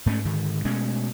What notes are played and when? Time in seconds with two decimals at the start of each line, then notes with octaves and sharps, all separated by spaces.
0.06 G#2 A3 C4 C#4
0.25 G#2 D3 D#3
0.65 B2 G#3 A3 C#4